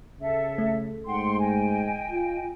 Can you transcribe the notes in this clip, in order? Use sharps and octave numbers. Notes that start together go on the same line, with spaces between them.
C#3 A4 E5
A3
G#2 F#5 G5 C6
D#5 G5 G#5
F4